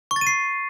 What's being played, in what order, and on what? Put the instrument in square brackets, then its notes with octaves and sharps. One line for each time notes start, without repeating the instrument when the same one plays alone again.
[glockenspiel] C#6
A6
D#7
C7